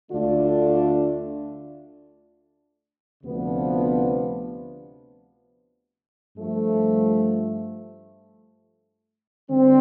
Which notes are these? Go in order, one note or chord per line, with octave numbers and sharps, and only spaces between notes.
D2 D3 A3 D4 F4
D2 C3 F3 B3 D4
G2 F3 A3
D3 G3 C4